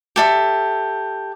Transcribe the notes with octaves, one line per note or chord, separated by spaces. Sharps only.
G4 A4 E5